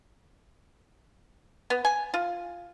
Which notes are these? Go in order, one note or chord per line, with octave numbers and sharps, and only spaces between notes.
B3
G#5
F4